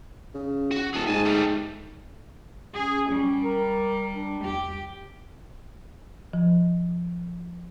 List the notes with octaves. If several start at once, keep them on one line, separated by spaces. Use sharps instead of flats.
C#3
F#4
D#1 G#4 A5
G#2 G#5 A5
G3 A3
C#4 G#4
G3 C#4
A#4
D4
E2 G4
F3